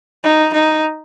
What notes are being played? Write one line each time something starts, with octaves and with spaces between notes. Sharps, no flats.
D#4
D#4